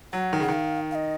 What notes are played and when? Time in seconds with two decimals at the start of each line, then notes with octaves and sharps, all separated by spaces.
0.13 F#3 F#5
0.33 D#3
0.40 C#3 F#5
0.49 D#3 F5
0.91 F5
0.95 D#5